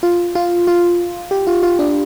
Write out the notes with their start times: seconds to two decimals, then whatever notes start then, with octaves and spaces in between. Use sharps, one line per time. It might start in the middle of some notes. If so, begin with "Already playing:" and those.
0.03 F4
0.35 F4
0.67 F4
1.31 G4
1.47 F4
1.63 F4
1.79 D4